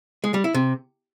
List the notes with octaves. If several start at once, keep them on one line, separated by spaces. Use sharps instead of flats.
G#3
G3
E4
C3